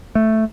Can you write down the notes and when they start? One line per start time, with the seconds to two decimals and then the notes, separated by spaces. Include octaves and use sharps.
0.15 A3